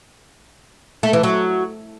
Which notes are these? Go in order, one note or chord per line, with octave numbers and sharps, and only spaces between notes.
A3
E3
F#3